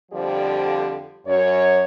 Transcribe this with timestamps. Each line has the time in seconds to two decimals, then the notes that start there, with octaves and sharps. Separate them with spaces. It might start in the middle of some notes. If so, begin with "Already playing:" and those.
0.12 F2 D3 F3 G3 G4 D5
1.26 F#2 C#5